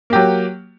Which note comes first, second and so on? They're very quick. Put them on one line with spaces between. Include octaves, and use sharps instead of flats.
A#3 G4 F#3